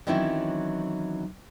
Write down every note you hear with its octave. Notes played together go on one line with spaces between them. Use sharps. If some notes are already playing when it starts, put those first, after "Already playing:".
D#3 E3 F#3 C4 C#4 E4